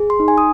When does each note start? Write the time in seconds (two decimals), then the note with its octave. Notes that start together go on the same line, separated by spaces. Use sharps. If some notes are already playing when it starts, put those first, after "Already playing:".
Already playing: G#4
0.10 C6
0.20 D#4
0.28 G#5
0.38 D#6